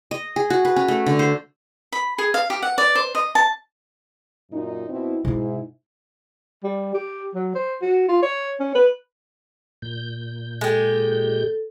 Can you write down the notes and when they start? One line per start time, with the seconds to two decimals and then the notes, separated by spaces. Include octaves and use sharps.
0.11 D#5
0.36 G#4
0.50 F#4
0.65 B4
0.76 C#4
0.88 A3
1.06 D3
1.19 C5
1.92 B5
2.18 G#4
2.34 F5
2.50 G4
2.62 F#5
2.78 D5
2.95 C5
3.15 D#5
3.35 A5
4.52 F#2 A#2 D#4
4.89 B2 C4 E4
5.25 G#2 B2 D#4 E4
6.64 G3
6.94 G4
7.35 F#3
7.55 C5
7.82 F#4
8.09 F4
8.23 C#5
8.60 C#4
8.75 B4
9.82 A#2 G6
10.61 G#3 G4 A4